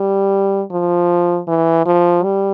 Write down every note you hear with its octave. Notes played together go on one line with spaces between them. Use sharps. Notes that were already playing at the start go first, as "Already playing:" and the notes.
Already playing: G3
F3
E3
F3
G3